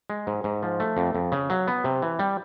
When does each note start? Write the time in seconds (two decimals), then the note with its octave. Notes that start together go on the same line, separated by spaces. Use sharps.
0.10 G#3
0.27 G#2
0.44 G#2
0.63 F3
0.80 A3
0.97 F2
1.15 F2
1.32 C#3
1.50 F#3
1.68 B3
1.84 C3
2.02 E3
2.19 G3